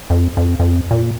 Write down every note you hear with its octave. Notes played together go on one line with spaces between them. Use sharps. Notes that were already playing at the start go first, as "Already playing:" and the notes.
F2
F2
F2
A#2